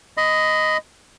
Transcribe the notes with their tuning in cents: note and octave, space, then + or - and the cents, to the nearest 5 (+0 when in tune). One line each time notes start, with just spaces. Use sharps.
D#5 +5 B5 +35